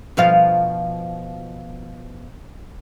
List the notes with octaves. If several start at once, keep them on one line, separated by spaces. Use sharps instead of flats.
B2 F3 F5